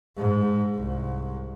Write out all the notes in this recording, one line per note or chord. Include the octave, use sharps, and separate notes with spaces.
G#2
C2